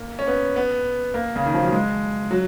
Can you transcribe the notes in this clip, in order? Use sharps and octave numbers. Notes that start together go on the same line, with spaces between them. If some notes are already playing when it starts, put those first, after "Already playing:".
Already playing: A#3
C#4
B3
B3
A#3
C#3
D#3
F3
F#3
G#3
F#3